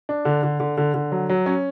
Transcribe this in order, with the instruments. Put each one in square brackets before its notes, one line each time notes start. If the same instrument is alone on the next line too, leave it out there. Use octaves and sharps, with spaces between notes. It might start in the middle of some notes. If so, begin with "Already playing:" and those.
[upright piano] D4
D3
D3
D3
D3
D3
F#3
F#3
C#4